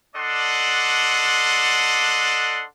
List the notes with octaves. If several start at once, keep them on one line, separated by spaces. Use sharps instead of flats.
D4 A4 D5 D#5 F#5 C6